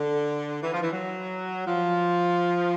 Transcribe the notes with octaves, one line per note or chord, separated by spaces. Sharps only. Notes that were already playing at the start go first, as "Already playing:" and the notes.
Already playing: D3
E3
F3
E3
F#3
F3